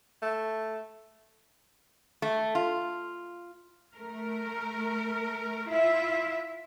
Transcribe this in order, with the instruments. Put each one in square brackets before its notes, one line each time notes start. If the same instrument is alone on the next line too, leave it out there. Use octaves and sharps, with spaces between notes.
[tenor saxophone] A3
[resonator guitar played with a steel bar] A3
F4
[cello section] A3 A#4
E4 F4 E5